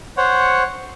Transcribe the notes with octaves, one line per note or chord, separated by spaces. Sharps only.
C5 C#5 F#5